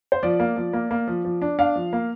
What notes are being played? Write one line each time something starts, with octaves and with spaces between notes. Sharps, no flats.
C5
F3 D5
A#3
F3
A#3
A#3
F3
F3
D4
D4 F5
F3
A#3